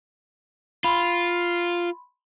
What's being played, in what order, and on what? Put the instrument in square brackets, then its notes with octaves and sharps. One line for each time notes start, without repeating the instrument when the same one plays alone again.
[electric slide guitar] F4 [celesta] B5 C6